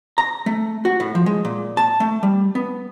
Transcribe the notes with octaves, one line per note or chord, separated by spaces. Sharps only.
A#5
A3
F#4
A2
F3
G#3
A#2
A5
A3
G3
B3